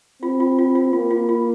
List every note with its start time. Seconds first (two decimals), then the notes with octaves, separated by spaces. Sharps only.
0.22 C4 F4
0.40 F4
0.59 F4
0.75 F4
0.93 A#3 F4
1.11 F4
1.29 F4